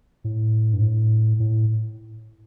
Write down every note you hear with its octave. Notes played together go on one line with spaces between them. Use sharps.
A2
G2
A2
A2